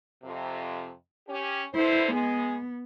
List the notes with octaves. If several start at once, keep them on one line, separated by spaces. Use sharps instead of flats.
F2 C3
C#4 G4
D3 B3 E4 C5
G#3 B3 G#4